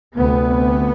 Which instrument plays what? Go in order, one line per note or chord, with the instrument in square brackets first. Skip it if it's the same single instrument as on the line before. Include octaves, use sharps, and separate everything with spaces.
[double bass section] D2 C3 B3